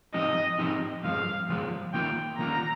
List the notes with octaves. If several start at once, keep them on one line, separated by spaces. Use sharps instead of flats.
G#2 F3 C4 D#4 G4 D#5
G#2 F3 C4 D#4 G4
G2 F3 G#3 F5
G2 F3 G#3
D#3 A#3 F4 G5
D#3 A#3 F4 A#5